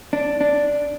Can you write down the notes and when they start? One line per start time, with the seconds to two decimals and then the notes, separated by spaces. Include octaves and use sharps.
0.13 D4
0.41 D4